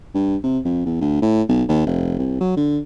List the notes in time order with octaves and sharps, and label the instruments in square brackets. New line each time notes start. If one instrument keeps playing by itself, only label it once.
[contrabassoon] G2
C3
F2
E2
D2
A2
B1
D#2
F1
C2
F#3
D3